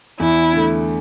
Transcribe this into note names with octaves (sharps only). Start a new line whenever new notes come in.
E2 E4
D3 A3